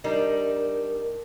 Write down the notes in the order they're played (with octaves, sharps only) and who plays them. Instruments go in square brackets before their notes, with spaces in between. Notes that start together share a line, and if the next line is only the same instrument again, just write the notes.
[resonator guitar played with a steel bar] G3 D4 D#4 [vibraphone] A#4